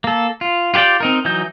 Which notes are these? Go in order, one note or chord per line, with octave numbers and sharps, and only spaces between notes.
A#3 A4
F4
F4 G4 B4 D5 G5
C4 D#4 A#4
E3 F#3 D#4 G6